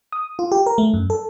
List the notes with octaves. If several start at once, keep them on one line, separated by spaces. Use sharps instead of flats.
D#6
F4
G4
A#4
A3
F#2
A4